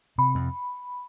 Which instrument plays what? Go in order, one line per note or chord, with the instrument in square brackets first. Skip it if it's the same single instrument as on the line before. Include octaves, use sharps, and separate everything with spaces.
[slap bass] C3 [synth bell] B5
[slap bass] F2